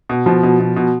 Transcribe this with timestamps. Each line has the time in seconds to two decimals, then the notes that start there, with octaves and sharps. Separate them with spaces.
0.09 B2
0.26 B2 F3
0.43 B2
0.60 B2
0.76 B2